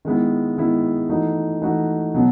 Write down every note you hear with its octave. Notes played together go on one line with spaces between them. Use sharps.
D#3 G#3 B3 E4
D#3 G#3 B3 E4
E3 A3 D#4 F#4
E3 A3 D#4 F#4
B2 F#3 B3